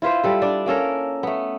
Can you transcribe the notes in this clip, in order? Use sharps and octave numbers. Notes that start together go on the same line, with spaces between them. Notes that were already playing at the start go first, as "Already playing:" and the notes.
E4 F4 B4 C5
G3 A4 B4
D4 D5
A#3 C#4 A4 A#4
A3 B3